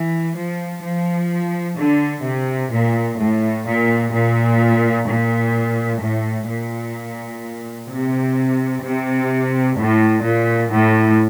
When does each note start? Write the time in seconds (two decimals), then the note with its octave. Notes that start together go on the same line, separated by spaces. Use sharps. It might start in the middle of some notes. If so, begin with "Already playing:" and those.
Already playing: E3
0.36 F3
0.84 F3
1.78 D3
2.25 C3
2.72 A#2
3.19 A2
3.66 A#2
4.13 A#2
5.08 A#2
6.02 A2
6.49 A#2
7.90 C3
8.84 C3
9.79 A2
10.25 A#2
10.72 A2